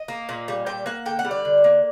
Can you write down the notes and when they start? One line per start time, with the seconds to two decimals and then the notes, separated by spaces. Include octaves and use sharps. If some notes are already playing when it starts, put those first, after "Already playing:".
Already playing: D#5
0.08 A#3
0.29 A#2
0.48 G3
0.66 A#2 G5
0.86 A#3 F#5
1.06 D3 G5
1.19 F#5
1.25 G3
1.31 D5
1.45 D3
1.64 A#3